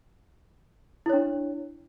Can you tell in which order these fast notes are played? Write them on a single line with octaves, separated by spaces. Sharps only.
E4 C#5 D4